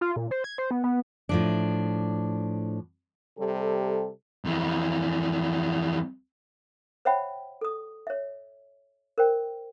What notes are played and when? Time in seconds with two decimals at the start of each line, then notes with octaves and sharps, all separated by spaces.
0.01 F4
0.16 A#2
0.31 C5
0.44 G#6
0.58 C5
0.71 B3
0.84 B3
1.29 A2 F3 D4
3.38 C3 G3 G4 A4
4.45 F2 E3
7.05 C5 C#5 E5 F#5 G5 B5
7.61 A4 D#6
8.07 C#5 E5
9.18 A#4 C5 G5